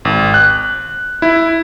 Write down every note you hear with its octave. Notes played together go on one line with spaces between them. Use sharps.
G#1
F#6
E4